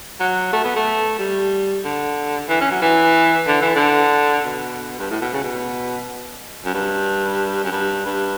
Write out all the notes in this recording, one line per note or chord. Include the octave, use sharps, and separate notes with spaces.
F#3
A3
B3
A3
G3
D3
E3
C#4
F#3
E3
D3
E3
D3
B2
G2
A2
B2
C#3
B2
F#2
G2
F#2
G2
G2